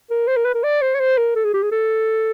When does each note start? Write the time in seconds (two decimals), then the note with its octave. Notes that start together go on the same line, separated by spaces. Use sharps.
0.10 A#4
0.27 C5
0.36 A#4
0.45 B4
0.54 A#4
0.63 D5
0.81 C5
0.95 C#5
1.00 C5
1.17 A#4
1.35 A4
1.44 G#4
1.53 G4
1.63 G#4
1.71 A4